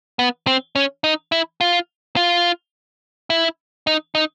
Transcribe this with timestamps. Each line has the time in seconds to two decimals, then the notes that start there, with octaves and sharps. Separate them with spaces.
0.19 B3
0.47 C4
0.75 C#4
1.04 D#4
1.32 E4
1.61 F4
2.16 F4
3.30 E4
3.87 D#4
4.15 D#4